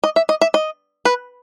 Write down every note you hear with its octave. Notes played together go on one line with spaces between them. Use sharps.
D#5
E5
D#5
E5
D#5
B4